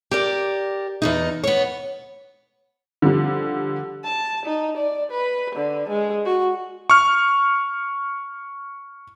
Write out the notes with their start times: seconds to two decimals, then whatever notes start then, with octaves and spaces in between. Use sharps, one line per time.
0.11 G4 A#4 D5
1.02 E2 G2 D#4
1.44 B3 C#5
3.02 D3 F3 G3
4.04 A5
4.45 D#4
4.77 D5
5.11 B4
5.56 D3
5.89 G#3
6.26 F#4
6.90 C#6 F6